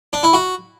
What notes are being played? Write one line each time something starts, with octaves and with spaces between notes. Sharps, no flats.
D4
E4
F#4